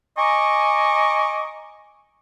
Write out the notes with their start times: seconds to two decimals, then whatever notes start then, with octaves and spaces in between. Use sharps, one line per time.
0.18 D#5 G#5 A#5 C#6 D6